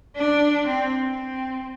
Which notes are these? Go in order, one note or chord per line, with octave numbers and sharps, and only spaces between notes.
D4
C4
C4